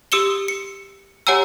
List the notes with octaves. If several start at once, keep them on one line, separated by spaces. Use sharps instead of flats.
G4 D#6 E6 C#7 E7 G7
C#7
G4 C#5 F#5 G#5 A#5 E6